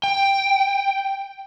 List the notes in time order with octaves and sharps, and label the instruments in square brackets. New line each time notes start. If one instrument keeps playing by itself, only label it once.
[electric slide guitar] G5